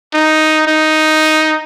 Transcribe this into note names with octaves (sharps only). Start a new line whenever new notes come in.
D#4
D#4